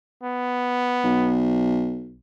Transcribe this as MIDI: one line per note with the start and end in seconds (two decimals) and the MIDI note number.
0.23 1.46 59
1.04 2.18 35